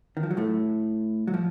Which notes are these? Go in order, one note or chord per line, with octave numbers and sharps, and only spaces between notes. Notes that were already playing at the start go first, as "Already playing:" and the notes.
D#3
F3
F#3
A2 A3
F#3
F3